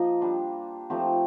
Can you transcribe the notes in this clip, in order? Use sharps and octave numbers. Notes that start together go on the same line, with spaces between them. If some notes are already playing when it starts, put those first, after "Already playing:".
Already playing: F3 A#3 D#4 D#5
G3 D4 F4
F3 A3 C4 D#4 G4